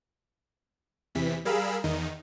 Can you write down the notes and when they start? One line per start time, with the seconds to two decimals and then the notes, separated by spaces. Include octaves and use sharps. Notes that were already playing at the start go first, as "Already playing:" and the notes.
1.15 E2 C3 E3 B6
1.45 G3 G#4 A#4 F5 B5 E6
1.84 E2 D#3 D#4